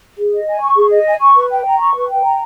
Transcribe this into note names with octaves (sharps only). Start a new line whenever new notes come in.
G#4
D#5
G#5
C#6
G#4
D#5
G#5
C#6
B4
G5
A#5
C#6
B4
G5
A#5